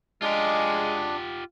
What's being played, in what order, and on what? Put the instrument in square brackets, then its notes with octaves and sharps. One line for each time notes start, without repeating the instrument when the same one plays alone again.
[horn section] G#3 [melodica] D4 [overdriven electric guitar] F4 G4